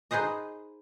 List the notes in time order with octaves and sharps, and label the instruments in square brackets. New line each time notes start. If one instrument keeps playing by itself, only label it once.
[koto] D#4 G#4 B4 C5 D#5